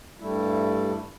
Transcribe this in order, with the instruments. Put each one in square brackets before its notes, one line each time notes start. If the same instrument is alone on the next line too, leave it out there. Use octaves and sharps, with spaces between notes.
[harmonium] G2 G3 A3 E4